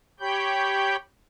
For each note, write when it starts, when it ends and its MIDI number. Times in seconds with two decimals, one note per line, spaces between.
0.20 0.96 67
0.20 0.96 73
0.20 0.96 79
0.20 0.96 83
0.20 0.96 91